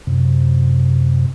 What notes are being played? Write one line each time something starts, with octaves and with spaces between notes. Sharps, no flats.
F#2 C3